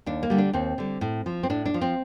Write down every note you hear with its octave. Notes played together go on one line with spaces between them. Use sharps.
D#2 D4
A#3
D3 G3
D4
D#2 C4
D3 G3
A2
F3
C4
A2 D4
D4
F3
C4